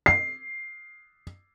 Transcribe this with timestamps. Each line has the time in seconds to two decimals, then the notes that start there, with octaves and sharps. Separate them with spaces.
0.06 C7